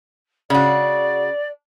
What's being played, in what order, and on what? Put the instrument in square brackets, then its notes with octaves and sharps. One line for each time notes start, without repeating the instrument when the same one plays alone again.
[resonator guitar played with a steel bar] C#3 F#4 [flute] D5